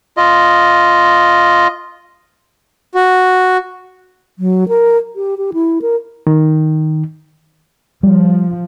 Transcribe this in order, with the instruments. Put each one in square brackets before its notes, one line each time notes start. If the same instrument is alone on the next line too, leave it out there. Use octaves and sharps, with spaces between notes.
[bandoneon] F4 D#5
[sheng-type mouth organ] F#4
[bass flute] F#3
A#4
G4
G4
E4
A#4
[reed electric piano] D#3
[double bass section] F3 [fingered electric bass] G3